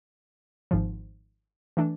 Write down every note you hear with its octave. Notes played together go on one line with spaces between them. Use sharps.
G#1 G#2 F3
E3 A3 D4